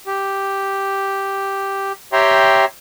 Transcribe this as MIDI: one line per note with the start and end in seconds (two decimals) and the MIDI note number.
0.07 1.92 67
2.13 2.65 67
2.13 2.65 73
2.13 2.65 76
2.13 2.65 79
2.13 2.65 82
2.13 2.65 84